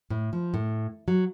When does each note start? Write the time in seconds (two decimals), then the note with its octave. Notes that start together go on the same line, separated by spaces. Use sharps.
0.10 A2
0.33 F3
0.54 A2
1.08 F#3